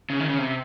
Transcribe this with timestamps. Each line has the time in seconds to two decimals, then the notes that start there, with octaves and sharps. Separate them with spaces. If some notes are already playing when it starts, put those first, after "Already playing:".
0.10 C#3
0.20 D#3
0.29 C#3
0.38 C3